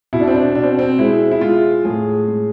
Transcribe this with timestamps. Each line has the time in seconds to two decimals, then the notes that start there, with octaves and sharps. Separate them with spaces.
0.13 B2 E4
0.20 D4
0.27 C4
0.35 D4
0.55 B2 D4
0.63 C4
0.79 C4
0.99 G#3 E4
1.31 E4
1.41 G#3 F4
1.85 A2 G#4
2.28 G#3